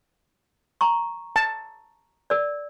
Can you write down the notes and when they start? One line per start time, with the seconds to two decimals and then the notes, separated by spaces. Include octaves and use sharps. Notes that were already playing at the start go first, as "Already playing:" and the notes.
0.81 A#5 C#6
1.36 A5
2.30 A#4 D5